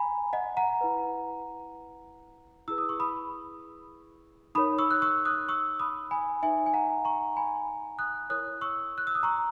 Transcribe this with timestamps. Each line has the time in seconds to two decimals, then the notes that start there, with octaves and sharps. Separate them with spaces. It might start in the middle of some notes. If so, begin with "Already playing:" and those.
Already playing: G#5 A#5 B5
0.33 D#5 F#5
0.57 F#5 A#5
0.81 E4 B4
2.68 E4 G#4 B4 E6
2.78 D#6
2.89 C#6
3.00 B5 D#6
4.55 D#4 A#4 C#5 B5 D#6
4.78 C#6 E6
4.91 F#6
5.02 C#6 E6
5.25 D#6 F#6
5.49 C#6 E6
5.80 B5 D#6
6.11 G#5 B5
6.43 D#4 A#4 C#5 E5 G#5
6.66 G#5
6.74 F#5 A#5
7.05 A#5 C#6
7.36 G#5 B5
7.99 D#6 F#6
8.30 E4 A#4 C#5 D#6 F#6
8.61 C#6 E6
8.98 F#6
9.07 E6
9.15 D#6
9.23 A#5 C#6